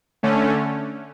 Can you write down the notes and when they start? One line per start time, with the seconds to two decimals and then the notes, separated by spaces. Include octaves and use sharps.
0.23 D3 A3 C#4